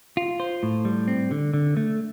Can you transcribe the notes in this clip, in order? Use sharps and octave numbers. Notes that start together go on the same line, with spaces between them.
F4
C5
A2
G3
C4
D3
D3
A3